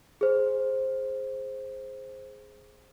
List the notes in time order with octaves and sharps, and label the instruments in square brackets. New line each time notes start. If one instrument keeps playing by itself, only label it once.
[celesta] G#4 C5